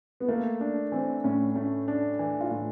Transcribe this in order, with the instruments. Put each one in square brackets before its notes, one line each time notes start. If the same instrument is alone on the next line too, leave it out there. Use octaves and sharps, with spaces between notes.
[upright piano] B3
[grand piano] A3 [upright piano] A#3
[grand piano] D4
[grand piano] E3 [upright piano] C4
[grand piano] A2 [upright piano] C#4
[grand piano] A3 [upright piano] C#4
[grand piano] D4
E3
[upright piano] F4
[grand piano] A2